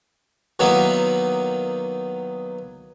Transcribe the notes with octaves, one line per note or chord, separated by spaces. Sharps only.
D#3 F#3 A#3 B3 D#4 E4